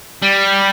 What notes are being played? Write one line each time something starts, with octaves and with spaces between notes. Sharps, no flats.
G3